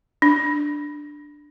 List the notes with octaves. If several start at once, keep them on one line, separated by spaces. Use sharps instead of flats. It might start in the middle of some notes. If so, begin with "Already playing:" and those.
D4